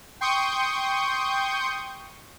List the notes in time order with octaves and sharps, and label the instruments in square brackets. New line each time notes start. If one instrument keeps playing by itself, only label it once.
[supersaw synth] G5 C6 C#6 D#6 G6